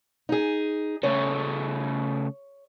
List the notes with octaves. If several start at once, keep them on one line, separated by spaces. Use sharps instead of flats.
D#4 G#4
C#3 A3 C#5